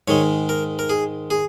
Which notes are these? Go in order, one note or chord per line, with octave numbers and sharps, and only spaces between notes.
G#2 D#3 G#3 C#5
A#4
A#4
G#4
G#4